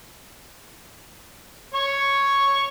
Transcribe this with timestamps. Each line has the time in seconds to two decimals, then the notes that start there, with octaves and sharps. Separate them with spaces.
1.74 C#5 C#6